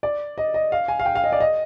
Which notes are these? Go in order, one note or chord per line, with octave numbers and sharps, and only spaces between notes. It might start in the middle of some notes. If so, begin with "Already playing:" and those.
D5
D#5
D#5
F5
G#5
F5
G5
F5
D#5
D5
D#5